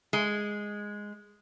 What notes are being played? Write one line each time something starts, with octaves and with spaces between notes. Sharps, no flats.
G#3